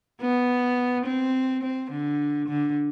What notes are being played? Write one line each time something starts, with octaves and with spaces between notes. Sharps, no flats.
B3
C4
C4
D3
D3